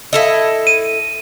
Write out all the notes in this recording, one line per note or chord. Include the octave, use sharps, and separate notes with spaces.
E4 A4 D#5
D#7